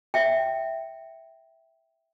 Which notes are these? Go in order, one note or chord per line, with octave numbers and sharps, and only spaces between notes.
E5 G5